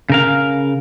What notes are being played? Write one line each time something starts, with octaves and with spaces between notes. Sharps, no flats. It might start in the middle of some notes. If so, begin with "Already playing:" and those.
C#3 A#4 F5